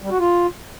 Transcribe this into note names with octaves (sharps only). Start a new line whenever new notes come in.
G3
F#4
F4